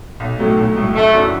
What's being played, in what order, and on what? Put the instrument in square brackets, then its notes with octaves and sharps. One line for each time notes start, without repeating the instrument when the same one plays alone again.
[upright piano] B1
A2 F#3 A3
B1
A2 F#3 A3
[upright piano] F#1 [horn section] A3
[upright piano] F#2 E3 D4 F#4